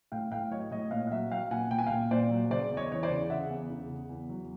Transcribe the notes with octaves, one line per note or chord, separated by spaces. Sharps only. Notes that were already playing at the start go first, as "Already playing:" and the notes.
A2 F5 G5
A2 F5 G5
F#3 C#5 D#5
A2 C#5 D#5
A#2 D#5 F5
F5
F#3 E5 F#5
F#3 F5 G5
A#2 F#5 G#5
A#2 G5
G#5
A#2 F5 G5
A#2 C5 D5
F#3
C#3 C5 D5
E2
C#5 D#5
E3 C#5
C5 D5
C#3
C#3 E5 F#5
E2
C#3
C#3
E2
F#3